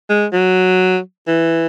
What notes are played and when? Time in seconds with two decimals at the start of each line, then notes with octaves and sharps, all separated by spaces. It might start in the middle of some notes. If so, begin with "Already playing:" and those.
0.10 G#3
0.33 F#3
1.28 E3